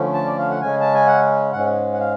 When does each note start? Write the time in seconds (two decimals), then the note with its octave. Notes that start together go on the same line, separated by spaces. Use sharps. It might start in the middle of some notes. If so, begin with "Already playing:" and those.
Already playing: D3 F3 A3 C#4
0.14 A5
0.26 D5
0.38 F5
0.49 F#5
0.61 C#3 G#3 C#4 G#5
0.80 A5
0.94 G#5
1.07 F#5
1.52 G#2 G#3 C#4 F#5
1.93 F#5
1.99 F5